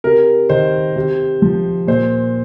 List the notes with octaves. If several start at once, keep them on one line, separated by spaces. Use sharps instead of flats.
C3 A#4
D#3 C5
C3
F3
A#2 C5